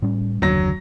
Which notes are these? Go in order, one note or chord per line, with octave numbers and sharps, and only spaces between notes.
A2 G3 C#4
F#1 D#2 D3 F#3 A#6